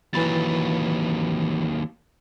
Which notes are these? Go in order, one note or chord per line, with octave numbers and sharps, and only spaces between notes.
D#2 E3 F#3 B5 A6